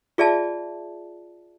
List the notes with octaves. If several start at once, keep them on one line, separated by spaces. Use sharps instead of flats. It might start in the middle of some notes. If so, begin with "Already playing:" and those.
F4 G#4 D5 E5 A5